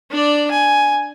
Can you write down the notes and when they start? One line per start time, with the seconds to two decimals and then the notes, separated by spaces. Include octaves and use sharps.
0.11 D4 D5
0.51 G#5